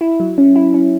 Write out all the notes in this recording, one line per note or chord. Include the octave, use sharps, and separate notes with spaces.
E4
F#3
C#4
E4
C#4